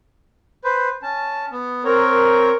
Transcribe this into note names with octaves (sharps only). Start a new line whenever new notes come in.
B4 C5
C#4 A5
B3
C4 A#4 C#5